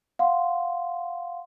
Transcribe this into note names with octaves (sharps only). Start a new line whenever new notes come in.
F5 F#5 C6